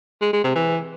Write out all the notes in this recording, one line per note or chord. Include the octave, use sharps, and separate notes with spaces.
G#3
G#3
C3
E3